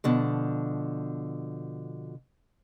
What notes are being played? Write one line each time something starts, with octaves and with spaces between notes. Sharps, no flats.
B2 D3 F3